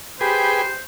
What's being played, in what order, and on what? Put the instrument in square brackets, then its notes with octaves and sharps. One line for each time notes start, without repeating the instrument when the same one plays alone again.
[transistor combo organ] G4 G#4 B4 [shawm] C5